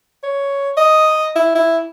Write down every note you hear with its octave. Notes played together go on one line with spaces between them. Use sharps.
C#5
D#5
E4
E4